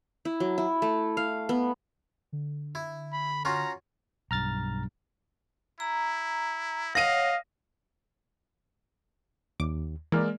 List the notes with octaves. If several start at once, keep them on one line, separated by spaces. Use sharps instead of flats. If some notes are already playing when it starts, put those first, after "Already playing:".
E4
F#3
E4
A3
F5
B3
D3
E4
B5
C#4 F4 F#4 A#5
B1 G2 A#5 F6 A6
E4 A#5
C#5 D#5 F5 F#5 A#6 D#7
D#2 D6
E3 G#3 A#3 A#4 D5 F6